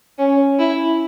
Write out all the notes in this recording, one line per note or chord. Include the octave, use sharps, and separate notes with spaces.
C#4
E4